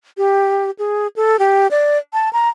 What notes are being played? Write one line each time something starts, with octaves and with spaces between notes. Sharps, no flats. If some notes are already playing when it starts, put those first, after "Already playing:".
G4
G#4
A4
G4
D5
A5
A#5